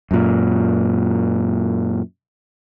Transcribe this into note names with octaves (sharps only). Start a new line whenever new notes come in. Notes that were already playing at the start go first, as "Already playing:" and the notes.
F#2 A#2